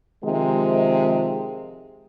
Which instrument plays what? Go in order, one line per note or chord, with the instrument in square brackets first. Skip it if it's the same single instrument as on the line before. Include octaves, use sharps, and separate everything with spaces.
[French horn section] C3 D#3 F3 G#3